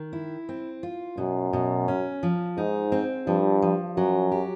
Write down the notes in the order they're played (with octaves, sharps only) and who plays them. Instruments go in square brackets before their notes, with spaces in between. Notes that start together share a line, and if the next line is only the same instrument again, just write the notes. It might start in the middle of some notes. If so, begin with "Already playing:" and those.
Already playing: [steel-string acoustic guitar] D#3
E4
C4
F4
[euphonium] F#2 [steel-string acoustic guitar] B2
[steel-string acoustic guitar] B2
C#4
F3
[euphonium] G#2 [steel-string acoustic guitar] D#4
[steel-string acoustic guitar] C4
[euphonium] G2 [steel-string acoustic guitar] F3
[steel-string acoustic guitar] F3
[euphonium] F#2 [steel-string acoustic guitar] F#3
[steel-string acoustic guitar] G4